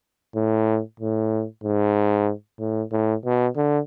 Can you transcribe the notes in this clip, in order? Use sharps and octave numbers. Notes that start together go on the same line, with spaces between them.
A2
A2
G#2
A2
A2
B2
D3